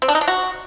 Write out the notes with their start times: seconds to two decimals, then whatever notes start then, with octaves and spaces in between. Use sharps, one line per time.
0.02 C4
0.08 D4
0.15 D#4
0.21 D4
0.28 F#4